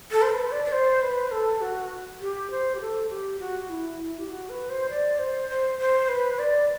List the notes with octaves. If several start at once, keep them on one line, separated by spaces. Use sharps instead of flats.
A4
C5
B4
D5
D5
C5
B4
A4
F#4
G4
C5
G4
A4
G4
F#4
E4
G4
F#4
B4
C5
D5
C5
C5
C5
B4
D5